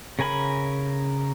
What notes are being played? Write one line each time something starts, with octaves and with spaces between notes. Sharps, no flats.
C#3 A#4 G#5 B5